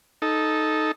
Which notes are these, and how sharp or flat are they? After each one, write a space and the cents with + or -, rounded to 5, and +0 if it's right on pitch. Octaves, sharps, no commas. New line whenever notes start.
D#4 +0 A4 -10